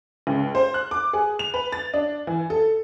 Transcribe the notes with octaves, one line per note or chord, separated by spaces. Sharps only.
C#2
C5
F#6
D6
G#4
F7
B4
A6
D4
E3
A4